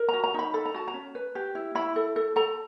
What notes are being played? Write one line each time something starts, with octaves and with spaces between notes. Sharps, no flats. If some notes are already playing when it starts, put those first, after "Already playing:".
Already playing: A#4
F#4 A#5
A#5
D#4 B5
A4 B5
A#5
F#4 A5
A#5
C#4
B4
G4
E4
E4 B5
A4
A4
A4 A#5